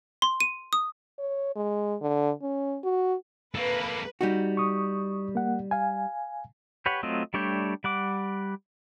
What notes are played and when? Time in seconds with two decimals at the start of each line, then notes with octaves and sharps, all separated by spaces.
0.22 C6
0.40 D#7
0.73 D#6
1.19 C#5
1.56 G#3
2.02 D3
2.42 C#4
2.84 F#4
3.55 A#3 A4 B4
4.21 G3 D#4 F#4
4.57 C#6 D#6
5.35 A#3 F#5
5.71 F5 G#5
6.86 G4 B4 C#5 F#5
7.03 F#3 A3 C4 F4 D#5
7.34 G3 A3 D4 C#5 G5
7.84 G3 F#5 D6